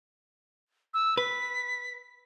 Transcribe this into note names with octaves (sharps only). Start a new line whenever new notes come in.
E6
B4 B6